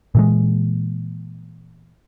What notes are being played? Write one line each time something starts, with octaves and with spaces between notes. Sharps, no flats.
A#2 E3 G#3